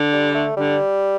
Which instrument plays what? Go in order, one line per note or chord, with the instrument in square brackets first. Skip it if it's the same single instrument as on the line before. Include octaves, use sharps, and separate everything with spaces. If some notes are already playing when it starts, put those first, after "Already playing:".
Already playing: [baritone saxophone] D3
[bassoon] G3
A3
[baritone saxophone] D3 [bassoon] G3